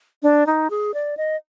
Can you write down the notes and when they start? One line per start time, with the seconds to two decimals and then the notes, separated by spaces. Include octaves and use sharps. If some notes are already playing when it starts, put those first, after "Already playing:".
0.23 D4
0.46 D#4
0.70 G#4
0.94 D5
1.17 D#5